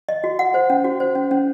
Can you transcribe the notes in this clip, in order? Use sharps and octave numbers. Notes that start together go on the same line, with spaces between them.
D#5
F#4
F#5
C5
C#4
F#4
C5
C#4
C#4